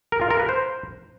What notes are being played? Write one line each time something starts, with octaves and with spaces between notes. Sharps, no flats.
A#4
F4
A#4
B4
C5